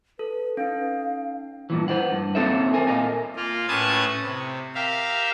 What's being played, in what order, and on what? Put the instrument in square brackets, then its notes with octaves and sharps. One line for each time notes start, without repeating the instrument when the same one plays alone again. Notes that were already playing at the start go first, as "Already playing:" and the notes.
[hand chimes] A4 [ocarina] B4
[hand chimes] C#4 D#4 [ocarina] F5
[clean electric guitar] G2 A#2 E3
B4 C5 D5 F#5
G2
A#3 C4 D#4 A4 C#5 E5
A#4 C5 G#5
A#2 D#5 F5 G#5
[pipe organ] A#3 F4
A2 C#4 B4 A5 D#6 G#6
C3
G4 A#4 E5 F5